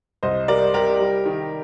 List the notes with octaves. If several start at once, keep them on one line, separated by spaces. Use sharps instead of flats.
C2 C5 D#5
G3 A#4 D5
C3 G4 A#4
G3
D#3